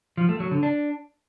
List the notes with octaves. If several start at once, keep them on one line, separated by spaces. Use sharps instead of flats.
F3
A3
F#3
D3
D4